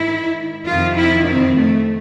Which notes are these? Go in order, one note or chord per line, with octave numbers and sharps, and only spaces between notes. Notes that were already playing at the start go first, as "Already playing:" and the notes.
Already playing: G#2 D#3 E4
F2 C3 D#3 F4
E4
C4
A3